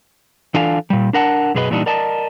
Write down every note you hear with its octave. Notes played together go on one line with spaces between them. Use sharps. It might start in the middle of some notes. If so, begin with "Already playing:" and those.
E3 D4 F4 A4 F5 G#5
A#2 G3
D4 A#4 F#5 A5
F#2 B2 G#4 B4 D#5
A#2 E3 G3 D4 D#4
A#4 D5 D#5 A5